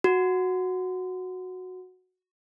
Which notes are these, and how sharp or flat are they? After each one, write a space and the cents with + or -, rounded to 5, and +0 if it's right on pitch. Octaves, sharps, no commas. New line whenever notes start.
F#4 -5